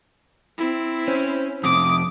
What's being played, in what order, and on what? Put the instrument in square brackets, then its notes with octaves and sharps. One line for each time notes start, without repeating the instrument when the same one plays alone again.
[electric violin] C4 E4
[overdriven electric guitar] C#4 [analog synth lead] C5
[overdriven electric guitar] F2 C3 [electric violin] D6 [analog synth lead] D#6